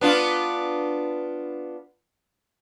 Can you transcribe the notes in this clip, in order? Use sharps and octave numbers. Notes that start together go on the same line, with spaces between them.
B3 D4 F4